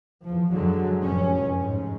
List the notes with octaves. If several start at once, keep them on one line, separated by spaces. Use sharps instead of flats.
E2 F3
F#2 D3 F#3 G#3
F1 F#2 C#4
G#2